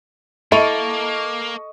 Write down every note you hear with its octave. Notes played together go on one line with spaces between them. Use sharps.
A#3 E4 A4 D#5 C#6 D#7